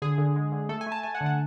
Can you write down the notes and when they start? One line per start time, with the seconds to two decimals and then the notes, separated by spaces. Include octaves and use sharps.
0.02 D3 G#4
0.18 D3
0.36 G#3
0.52 D3
0.69 A3 A4
0.81 G#5
0.86 A3
0.92 A5
1.03 A3 G#5
1.15 F#5
1.21 D3
1.26 F#5